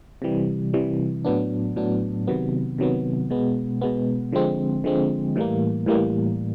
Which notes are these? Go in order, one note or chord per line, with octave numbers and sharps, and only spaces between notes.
C3 E3 G3
C3 E3 G3
A2 F#3 B3 D4
A2 F#3 B3 D4
C3 D#3 F#3 B3
C3 D#3 F#3 B3
B2 G#3 B3
B2 G#3 B3
D3 F3 G#3 C4
D3 F3 G#3 C4
A2 E3 G3 A#3
A2 E3 G3 A#3